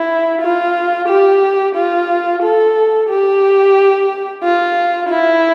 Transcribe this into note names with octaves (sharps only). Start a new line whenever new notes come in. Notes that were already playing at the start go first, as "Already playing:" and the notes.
Already playing: E4
F4
G4
F4
A4
G4
F4
E4